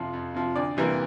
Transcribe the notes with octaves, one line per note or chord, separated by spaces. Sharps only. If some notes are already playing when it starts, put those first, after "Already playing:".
Already playing: F2 C3 F3
F2
C3 F3
D2 D5
C3 E3 G3 A#3